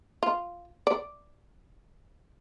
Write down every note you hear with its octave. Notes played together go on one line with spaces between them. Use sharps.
F4
D5